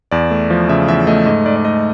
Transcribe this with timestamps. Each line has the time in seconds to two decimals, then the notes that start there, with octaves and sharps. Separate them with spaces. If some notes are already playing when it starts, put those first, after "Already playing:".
0.11 E2 D5
0.31 A3
0.50 F3
0.69 C#3 E5
0.88 E2 E5
1.07 A3 D#5
1.26 G#2 D#5
1.46 G#2 D5
1.57 D5
1.65 A3 D#5